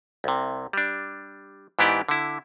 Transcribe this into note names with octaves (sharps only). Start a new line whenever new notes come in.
C2 C3
G3 D4
G#2 E3 B3 E4 G4 D5
D3 E4